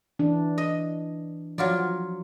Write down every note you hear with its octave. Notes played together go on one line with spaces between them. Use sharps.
E3 D4
D#5
F3 F#3 F4 D5